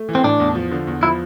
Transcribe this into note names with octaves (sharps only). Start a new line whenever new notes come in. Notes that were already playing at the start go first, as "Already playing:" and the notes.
Already playing: A3
E3
C4
A2 D4
E2
F3
D3
E2
F3 E4